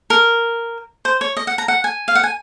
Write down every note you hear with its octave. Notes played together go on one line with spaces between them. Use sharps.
A#4
C5
C#5
D#5
F#5
A#5
F#5
G#5
F5
F#5
G#5